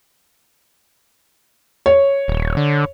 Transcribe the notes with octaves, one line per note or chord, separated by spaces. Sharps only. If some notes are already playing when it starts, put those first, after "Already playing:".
C#5
D#1
D3